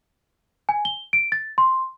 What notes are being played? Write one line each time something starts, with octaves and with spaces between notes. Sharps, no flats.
G#5
G7
D7
A6
C6